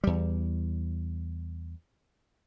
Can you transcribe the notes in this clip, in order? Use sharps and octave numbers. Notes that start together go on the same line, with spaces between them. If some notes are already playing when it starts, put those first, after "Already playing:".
E2 G3